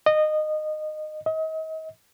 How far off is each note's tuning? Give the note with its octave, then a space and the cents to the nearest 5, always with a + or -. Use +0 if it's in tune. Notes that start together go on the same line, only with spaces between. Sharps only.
D#5 -20
D#5 +35